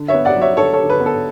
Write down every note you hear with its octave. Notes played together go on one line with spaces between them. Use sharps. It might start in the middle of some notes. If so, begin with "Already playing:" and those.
Already playing: D3
C#5 E5
B3
D5 F#5
F#3
C#5 E5
D3 A4 C#5
A4 C#5
D3
B4
B3
A4